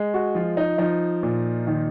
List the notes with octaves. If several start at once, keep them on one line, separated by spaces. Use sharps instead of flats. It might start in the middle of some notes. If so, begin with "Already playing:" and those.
Already playing: G#3
F#4
F3 F4
D#4
F3 D#4
A#2
D#3